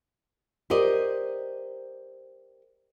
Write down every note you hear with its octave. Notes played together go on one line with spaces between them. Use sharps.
G4 A#4 C5 D5 D#5